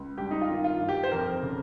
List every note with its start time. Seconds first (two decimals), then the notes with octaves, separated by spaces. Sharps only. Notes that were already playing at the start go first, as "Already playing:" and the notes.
Already playing: C#2
0.18 G2 G4
0.31 D#4
0.41 F4
0.49 D#3
0.64 F4
0.81 G1
0.89 G4
1.03 C5
1.11 F2 A#4
1.43 C#3